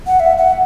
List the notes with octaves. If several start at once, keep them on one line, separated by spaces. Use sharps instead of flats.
F#5
E5
F#5